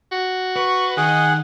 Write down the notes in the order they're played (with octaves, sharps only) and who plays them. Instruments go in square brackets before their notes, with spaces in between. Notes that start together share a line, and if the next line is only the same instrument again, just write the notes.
[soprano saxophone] F#4
[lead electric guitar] B4 [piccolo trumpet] C#6
[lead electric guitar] D#3 [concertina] G#4 F#5 [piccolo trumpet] D#5